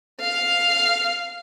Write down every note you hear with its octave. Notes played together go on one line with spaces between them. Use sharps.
F5